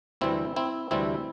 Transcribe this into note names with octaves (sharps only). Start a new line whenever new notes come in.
D2 C3 E3 G3 C4 E4
C4 E4
D2 C3 E3 G3 C4 E4